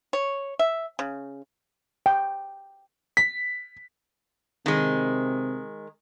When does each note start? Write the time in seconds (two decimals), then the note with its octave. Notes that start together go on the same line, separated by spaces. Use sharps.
0.13 C#5
0.59 E5
0.99 C#3
2.06 G5
3.17 B6
4.66 C3 D#3 G#3